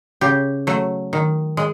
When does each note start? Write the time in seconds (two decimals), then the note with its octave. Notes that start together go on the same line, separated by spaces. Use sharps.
0.21 C#3 G4
0.67 F#3 A3
1.13 D#3
1.57 G#3